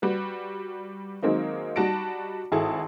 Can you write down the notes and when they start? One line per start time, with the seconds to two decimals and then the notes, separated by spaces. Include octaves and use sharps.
0.02 G3 F#4 B4
1.22 D#3 F#3 G#3 A#3 C4 D#4
1.76 G3 D#4 F#4 A5 A#6 D7
2.52 G#1 E4 G#4 A4 A5